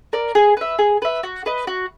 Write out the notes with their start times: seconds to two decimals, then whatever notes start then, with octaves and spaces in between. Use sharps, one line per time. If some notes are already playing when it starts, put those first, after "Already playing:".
0.13 A#4 D5
0.35 G#4
0.57 B4 E5
0.79 G#4
1.02 B4 E5
1.23 F#4
1.46 B4 D#5
1.67 F#4